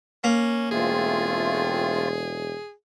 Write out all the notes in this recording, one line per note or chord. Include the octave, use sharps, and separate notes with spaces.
A#3 C#4
E1 A3 C4 F4 G#4